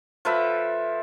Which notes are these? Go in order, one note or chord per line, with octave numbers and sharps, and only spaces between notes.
F3 A4 B4 E5